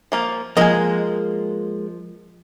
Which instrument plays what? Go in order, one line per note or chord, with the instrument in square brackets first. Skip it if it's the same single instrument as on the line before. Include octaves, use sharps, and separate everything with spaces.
[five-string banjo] F3 A#3 F4
[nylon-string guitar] F3 [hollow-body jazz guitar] G#3 A#3 [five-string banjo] D#5 G#5